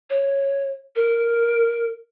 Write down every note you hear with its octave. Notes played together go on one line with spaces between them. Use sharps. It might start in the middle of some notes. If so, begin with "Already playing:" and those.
C#5
A#4